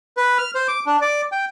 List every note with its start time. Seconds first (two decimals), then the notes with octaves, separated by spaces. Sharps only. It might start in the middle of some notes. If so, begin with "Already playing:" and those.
0.17 B4
0.38 F6
0.55 C5
0.68 D6
0.87 D4
1.02 D5
1.32 G5